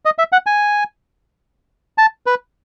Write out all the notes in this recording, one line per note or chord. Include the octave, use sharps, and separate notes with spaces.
D#5
E5
F#5
G#5
A5
B4